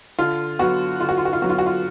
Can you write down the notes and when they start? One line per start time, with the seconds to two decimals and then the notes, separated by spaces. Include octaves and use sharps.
0.19 D3 F4
0.59 F#3 B3 F#4
1.00 D3 F4
1.09 F#4
1.17 F4
1.25 F#4
1.33 F4
1.42 F#3 B3 F#4
1.50 F4
1.58 F#4
1.66 F4